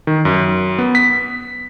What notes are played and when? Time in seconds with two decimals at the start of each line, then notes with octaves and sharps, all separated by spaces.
0.07 D#3
0.25 F#2
0.79 B3
0.95 B6